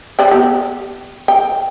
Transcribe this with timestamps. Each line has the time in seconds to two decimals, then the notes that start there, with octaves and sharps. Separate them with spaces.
0.19 B4 D5 G5
0.31 B3 G4
1.28 G5